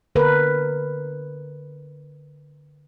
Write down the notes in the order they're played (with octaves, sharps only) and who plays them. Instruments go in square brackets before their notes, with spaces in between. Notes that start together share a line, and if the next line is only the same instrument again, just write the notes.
[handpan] D3 A#4 B4